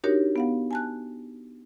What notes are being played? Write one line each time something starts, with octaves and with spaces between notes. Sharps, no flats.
D4 D#4 F#4 G4 A#4 C#5
B3 F5 F#5
G#5 A5 F#6